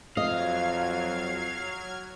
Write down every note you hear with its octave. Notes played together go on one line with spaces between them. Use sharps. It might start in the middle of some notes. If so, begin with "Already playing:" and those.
F2 F#3 D#5 F5 F6 G#6